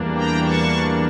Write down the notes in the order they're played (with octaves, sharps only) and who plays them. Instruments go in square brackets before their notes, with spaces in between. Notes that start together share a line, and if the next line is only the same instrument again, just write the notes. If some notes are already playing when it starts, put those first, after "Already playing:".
Already playing: [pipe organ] E2 E3 G3 A#3 D4
G5 A#5
A5 C#6